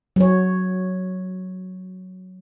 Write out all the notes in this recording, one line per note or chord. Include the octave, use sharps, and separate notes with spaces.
F#3 C#5